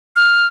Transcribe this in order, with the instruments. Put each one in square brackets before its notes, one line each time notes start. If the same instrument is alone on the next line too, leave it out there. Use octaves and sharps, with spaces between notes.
[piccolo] F6